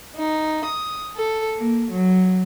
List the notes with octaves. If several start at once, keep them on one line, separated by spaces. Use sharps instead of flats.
D#4
D#6
A4
A#3
F#3